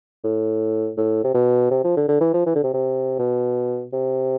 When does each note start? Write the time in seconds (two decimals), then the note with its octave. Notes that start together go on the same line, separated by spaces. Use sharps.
0.24 A2
0.98 A2
1.24 C3
1.34 B2
1.71 C3
1.84 F3
1.97 D3
2.08 D3
2.21 E3
2.34 F3
2.46 E3
2.55 D3
2.64 C3
2.74 C3
3.19 B2
3.93 C3